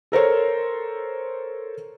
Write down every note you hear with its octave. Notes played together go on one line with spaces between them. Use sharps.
A4 A#4 C5 C#5